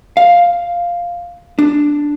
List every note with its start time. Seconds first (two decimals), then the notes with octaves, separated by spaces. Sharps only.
0.17 F5
1.59 D4